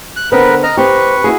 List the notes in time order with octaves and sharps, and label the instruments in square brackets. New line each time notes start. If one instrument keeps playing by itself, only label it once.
[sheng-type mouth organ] F#6
[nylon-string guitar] D3 B3 C4 [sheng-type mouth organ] A#4 B4
[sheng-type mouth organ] D#5 A#5 F6
[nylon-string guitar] C4 G4 [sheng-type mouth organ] B4 C#6
[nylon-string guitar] E4 F#4 G#4